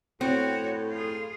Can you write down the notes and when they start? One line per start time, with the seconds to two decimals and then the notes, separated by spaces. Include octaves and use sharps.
0.21 A2 C4 F#4 C#5
0.91 F4 G#4